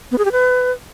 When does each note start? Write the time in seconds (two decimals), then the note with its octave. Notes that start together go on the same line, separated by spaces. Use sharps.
0.11 B3
0.18 G#4
0.25 G4
0.32 B4